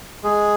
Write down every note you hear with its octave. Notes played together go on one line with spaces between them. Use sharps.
G#3 G#4